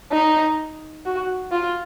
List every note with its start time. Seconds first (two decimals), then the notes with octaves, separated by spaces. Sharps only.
0.12 D#4
1.05 F#4
1.51 F4